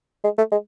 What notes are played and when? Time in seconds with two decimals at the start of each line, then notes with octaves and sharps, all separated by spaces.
0.24 G#3
0.38 A3
0.52 G#3